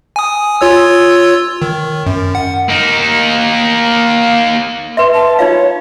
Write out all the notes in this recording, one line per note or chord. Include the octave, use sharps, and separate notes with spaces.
G#5 D#6
F4 C#5 E6
D#3
F#2
F#5
A#3 D#4
B4 E5 C6
A5
D#4 F4 C#5 F5